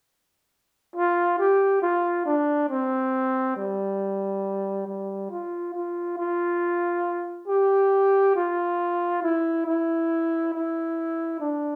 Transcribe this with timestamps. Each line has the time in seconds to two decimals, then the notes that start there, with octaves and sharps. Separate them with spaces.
0.96 F4
1.39 G4
1.82 F4
2.26 D4
2.69 C4
3.57 G3
4.87 G3
5.30 F4
5.74 F4
6.18 F4
7.48 G4
8.36 F4
9.23 E4
9.66 E4
10.53 E4
11.40 D4